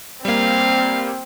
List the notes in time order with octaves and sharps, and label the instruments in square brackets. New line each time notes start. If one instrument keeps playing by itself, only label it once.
[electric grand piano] G3 A#3 [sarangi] C4 [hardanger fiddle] F5